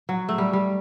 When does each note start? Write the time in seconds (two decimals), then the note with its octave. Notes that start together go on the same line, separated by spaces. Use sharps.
0.09 F#3
0.29 A3
0.38 G3
0.53 G3